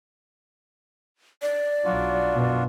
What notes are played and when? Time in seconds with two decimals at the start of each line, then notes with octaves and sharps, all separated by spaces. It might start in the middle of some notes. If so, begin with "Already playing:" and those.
1.42 D5
1.85 B1 F#3 D4 F4 F#4
2.35 F#2 B2